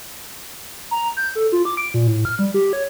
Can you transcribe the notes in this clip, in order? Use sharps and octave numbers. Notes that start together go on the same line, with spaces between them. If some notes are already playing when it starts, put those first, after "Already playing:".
A#5
G6
A4
F4
D6
D7
A#2
A2
F6
G3
G4
C#5